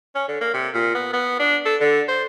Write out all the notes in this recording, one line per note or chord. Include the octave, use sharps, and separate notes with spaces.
C#4
D3
A#3
C3
A#2
B3
B3
D4
A4
D3
C5